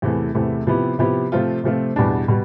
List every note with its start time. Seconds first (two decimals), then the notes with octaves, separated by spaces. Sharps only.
0.02 E2 C3 E3 A3
0.35 E2 C3 E3 A3
0.67 C3 F3 B3 E4 G4
0.99 C3 F3 B3 E4 G4
1.32 C3 F3 A3 C4 F4
1.64 C3 F3 A3 C4 F4
1.96 E2 B2 G3 D4
2.28 B2 G3